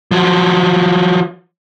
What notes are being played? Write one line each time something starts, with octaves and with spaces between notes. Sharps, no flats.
F3 F#3